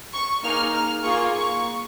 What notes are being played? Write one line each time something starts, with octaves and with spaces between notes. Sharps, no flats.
C#6
A#3 D#4 G#4 F6
F6
A#3 F4 G#4 C#6
C#6